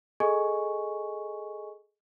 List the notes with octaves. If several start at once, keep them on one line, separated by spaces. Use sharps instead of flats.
G#4 A4 D#5 G#5 C#6